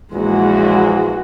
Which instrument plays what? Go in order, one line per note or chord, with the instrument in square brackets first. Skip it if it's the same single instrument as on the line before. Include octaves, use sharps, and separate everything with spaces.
[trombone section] A#1 E2 [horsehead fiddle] G#3 F#4